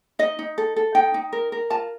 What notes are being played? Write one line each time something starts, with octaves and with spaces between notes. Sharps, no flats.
D#4 D#5
D#4
A4
A4
D#4 G5
D#4
A#4
A#4
F4 A5